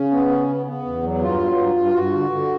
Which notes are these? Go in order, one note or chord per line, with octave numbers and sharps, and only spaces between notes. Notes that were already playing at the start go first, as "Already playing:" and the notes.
Already playing: C#3 C#4
B3
C#3
B3
B3
E2
F#3
G2 F4
F#3
G2
G2
G2 F#4
D3
D3